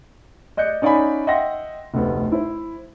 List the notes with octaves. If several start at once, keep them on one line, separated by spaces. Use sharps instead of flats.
D5 D#5 F#6 G6 C#7
C#4 D#4 D5 F5 G#5 B5
D#5 E5 F#5 G5 C6 A#6
F1 D2 B3
E4 C5